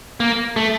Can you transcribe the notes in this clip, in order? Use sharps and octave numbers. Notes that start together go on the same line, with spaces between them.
A#3
A3